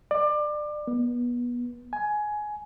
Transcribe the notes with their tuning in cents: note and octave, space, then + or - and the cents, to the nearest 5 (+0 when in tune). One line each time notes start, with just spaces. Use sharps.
D5 +25
B3 -25
G#5 +15